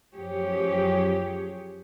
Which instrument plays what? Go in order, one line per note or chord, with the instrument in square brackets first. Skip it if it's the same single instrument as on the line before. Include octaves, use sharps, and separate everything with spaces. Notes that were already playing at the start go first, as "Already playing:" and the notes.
[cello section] F#2 F3 G4 G#4 C#5